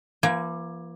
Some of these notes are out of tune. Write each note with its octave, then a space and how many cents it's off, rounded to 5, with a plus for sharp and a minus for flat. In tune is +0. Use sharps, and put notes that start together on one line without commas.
F3 -45 A#3 +25